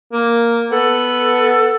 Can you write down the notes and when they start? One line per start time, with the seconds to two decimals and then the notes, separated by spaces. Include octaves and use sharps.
0.13 A#3
0.71 B3 A4